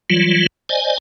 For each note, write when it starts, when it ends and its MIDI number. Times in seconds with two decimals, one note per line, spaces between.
0.10 0.46 52
0.10 0.46 54
0.10 0.46 55
0.10 0.46 65
0.69 0.98 72
0.69 0.98 74
0.69 0.98 75
0.69 0.98 80